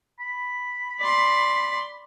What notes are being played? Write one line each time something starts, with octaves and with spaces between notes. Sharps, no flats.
B5
D5 C6